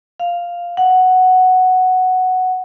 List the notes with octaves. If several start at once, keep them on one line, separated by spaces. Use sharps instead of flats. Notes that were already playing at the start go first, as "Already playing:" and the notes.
F5
F#5